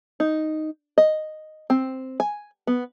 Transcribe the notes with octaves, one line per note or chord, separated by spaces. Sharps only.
D#4
D#5
C4
G#5
B3